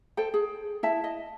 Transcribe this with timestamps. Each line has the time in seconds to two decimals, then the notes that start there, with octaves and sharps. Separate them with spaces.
0.17 A4 C5 G5
0.34 G#4
0.83 E4 E5 A5
1.04 D#5